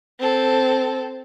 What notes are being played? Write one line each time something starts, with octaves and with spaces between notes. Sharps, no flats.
C4 A4